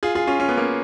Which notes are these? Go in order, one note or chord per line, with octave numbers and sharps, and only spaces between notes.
F4 G#4
F4 G#4
C#4 F4
C#4
B3
A#3 C#4